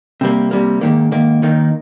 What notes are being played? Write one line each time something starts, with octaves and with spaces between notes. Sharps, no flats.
C3 G3 A#3
C3 G3 A#3
G#2 D#3 A#3
G#2 D#3 A#3
D#2 D#3 A#3 D#4